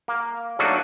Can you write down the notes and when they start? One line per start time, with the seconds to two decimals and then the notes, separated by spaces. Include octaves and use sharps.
0.08 A#3
0.59 F#3 A3 A#3 D4 D#4 F#4